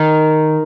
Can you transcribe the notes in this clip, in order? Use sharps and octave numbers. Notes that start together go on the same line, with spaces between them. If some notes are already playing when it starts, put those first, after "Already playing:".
Already playing: D#3